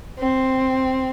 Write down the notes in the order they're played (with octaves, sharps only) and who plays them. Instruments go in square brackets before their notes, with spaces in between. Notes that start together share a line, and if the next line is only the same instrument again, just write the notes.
[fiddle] C4